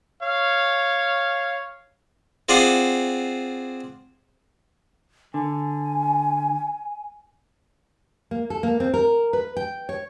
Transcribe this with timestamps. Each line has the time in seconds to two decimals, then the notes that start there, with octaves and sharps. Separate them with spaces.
0.22 C#5 F5
2.49 C4 F4 G#4 C5 D5 F#5
5.34 D3 G#5
8.31 A#3
8.50 A4
8.63 A#3
8.80 C4
8.94 A#4
9.33 B4
9.57 G5
9.89 C#5